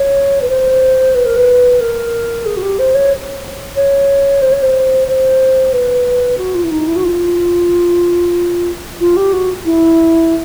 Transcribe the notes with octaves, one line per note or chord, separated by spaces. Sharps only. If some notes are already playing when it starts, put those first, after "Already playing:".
Already playing: C#5
B4
C5
B4
A#4
B4
A#4
G#4
F#4
G4
C5
C#5
C#5
C5
C#5
C5
C5
B4
F#4
F4
E4
D#4
E4
F#4
F4
F4
G4
F#4
E4